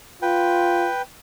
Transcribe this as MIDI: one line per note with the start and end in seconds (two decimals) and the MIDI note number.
0.22 0.89 65
0.22 1.02 71
0.22 1.02 79